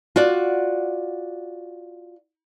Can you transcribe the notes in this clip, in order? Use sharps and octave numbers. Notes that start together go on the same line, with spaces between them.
F4 F#4 D5